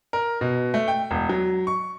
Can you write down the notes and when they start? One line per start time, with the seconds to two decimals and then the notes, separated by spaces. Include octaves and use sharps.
0.13 A#4
0.41 B2
0.74 A3
0.88 G5
1.11 E1
1.29 F#3
1.67 C#6